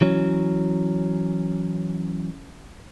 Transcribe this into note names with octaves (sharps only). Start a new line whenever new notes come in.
E3 F#3 C#4